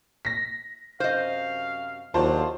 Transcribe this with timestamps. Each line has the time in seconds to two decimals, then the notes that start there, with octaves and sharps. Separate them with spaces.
0.25 A#6 B6
1.00 F#2 C3 C5 D#5 F5
2.14 D#2 F#3 D4 F4 C5 A5